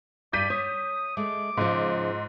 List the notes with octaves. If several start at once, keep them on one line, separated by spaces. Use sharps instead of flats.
G2 D5 G6 B6 D#7
C#5 D#6
G#3 A3 D6
G#2 C#3 F3